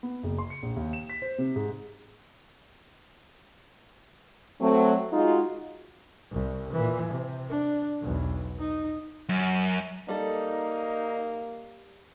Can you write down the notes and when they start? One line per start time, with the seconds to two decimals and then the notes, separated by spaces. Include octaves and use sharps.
0.03 B3
0.23 F#1
0.38 C6
0.50 C#7
0.63 A#1
0.76 D#2
0.93 E7
1.10 B6
1.22 C5
1.38 C3
1.56 G#2
4.61 F#3 A3 C4
5.13 G#3 D#4 F4 F#4
6.31 C2
6.73 A#2 E3
7.09 C3
7.49 D4
8.02 B1 E2
8.59 D#4
9.29 F#2
10.09 G3 A#3 D#4 A4